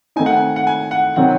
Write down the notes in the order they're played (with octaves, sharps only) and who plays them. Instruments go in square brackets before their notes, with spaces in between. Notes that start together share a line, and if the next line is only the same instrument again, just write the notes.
[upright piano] D#3 A3 C4 D#4 [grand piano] G#5
[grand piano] F#5
G#5
F#5
G#5
F#5
[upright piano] C3 D#3 F#3 C4 F#4 [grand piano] F#5